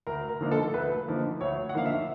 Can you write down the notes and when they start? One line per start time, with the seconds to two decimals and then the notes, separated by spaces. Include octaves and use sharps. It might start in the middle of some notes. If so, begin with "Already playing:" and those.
0.07 D2 A#4
0.29 A#4
0.41 D3 F3 A#3 D#4
0.51 A4
0.73 D2 B4
1.07 D3 F3 A#3 D#4
1.41 D2 C#5
1.69 F#5
1.74 D3 F3 A#3 D#4 F5
1.86 E5